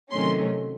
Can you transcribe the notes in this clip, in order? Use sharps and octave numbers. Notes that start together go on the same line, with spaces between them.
C3 D#3 F#3 A3 C#4 C6